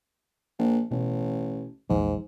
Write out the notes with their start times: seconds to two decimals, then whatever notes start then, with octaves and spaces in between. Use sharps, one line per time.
0.59 A#1
0.91 A1 B2
1.89 A#1 E2 G#2 F3